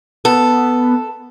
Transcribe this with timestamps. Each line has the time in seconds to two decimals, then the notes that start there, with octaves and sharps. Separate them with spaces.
0.25 B3 A4